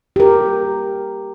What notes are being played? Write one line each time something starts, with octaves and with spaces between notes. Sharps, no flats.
G4 A#4